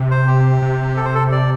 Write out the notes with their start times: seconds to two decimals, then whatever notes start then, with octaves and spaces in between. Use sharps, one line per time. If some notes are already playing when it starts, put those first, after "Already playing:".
Already playing: C3
0.11 C5
0.27 G4
0.62 C3
0.97 A4
1.05 C5
1.15 A4
1.32 D5